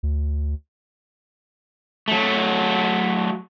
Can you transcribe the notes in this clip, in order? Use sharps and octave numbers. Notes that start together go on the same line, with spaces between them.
D2
F#3 A3